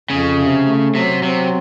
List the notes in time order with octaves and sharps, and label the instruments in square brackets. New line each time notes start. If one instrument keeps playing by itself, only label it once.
[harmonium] F2 [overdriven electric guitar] C#3
[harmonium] C3
A3
[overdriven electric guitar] C3 [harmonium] F#3
[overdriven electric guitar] C3 [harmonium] C4